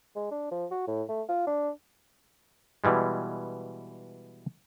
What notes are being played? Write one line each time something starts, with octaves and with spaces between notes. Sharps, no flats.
G#3
D4
F3
F#4
A2
A3
F4
D4
B2 E3 G3 G#3